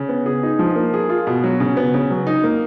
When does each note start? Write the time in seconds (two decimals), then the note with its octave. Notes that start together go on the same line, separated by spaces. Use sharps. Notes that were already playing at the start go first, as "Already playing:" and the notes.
Already playing: C#3
0.09 B3
0.26 G#4
0.43 D#4
0.59 F3
0.76 A#3
0.94 G#4
1.09 F4
1.27 B2
1.44 F#3
1.60 C#3
1.77 B3
1.94 C#3
2.10 F#3
2.27 D#4
2.44 A#3